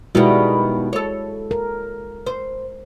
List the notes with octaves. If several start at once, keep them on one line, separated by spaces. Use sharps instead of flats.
B2 D#3 G3 G#3 E4 F#4
A4 C#5
A#4
C5